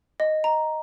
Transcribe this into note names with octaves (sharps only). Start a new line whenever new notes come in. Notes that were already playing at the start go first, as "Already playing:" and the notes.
D#5
A#5